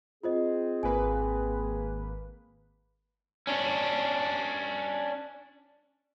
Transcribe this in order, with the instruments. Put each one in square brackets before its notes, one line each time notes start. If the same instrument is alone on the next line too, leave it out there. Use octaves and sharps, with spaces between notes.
[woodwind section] C4 G#4 [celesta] F4 C5 D#5
[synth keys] G#1 A#3 B4 [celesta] G#5
[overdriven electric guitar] C#4 D4